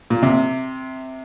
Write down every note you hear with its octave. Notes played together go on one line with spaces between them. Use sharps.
A#2
C3